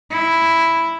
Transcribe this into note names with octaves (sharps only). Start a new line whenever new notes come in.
E4